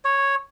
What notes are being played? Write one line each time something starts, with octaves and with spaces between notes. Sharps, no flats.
C#5